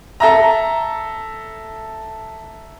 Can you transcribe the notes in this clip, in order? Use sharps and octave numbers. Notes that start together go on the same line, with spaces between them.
A4 E5 A#5